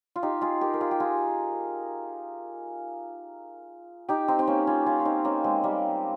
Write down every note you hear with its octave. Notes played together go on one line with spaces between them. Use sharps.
F4
D#4 G4
F4 G#4
G4 A#4
A#4
F4 G#4
G4
F4 G#4
D#4 G4
C4 D#4
C4
A#3 C#4
C#4 F4
C#4 F4
F4
C4 D#4
A#3 C#4
G#3 C4
G3 A#3